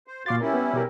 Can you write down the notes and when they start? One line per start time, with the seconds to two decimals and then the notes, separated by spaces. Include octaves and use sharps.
0.07 C5
0.26 A#2 F#4 F5 C6 D6 A6
0.41 G3 C#4 E4 A#4
0.54 B3
0.74 B2 G4 A#4